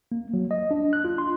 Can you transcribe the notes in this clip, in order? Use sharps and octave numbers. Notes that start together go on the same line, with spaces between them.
A#3
F#3
D#5
D4
F#6
F4
C6